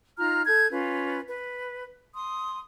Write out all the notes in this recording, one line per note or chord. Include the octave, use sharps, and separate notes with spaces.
D#4 F4 A#5 F6
A4 G6 G#6
C#4 F4 B4
B4
C6 D#6